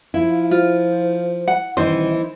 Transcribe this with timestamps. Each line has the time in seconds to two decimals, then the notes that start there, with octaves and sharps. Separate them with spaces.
0.14 F3 E4 F5
0.51 F4 C5
1.48 F#5
1.77 D#1 E3 D#4 C5 E5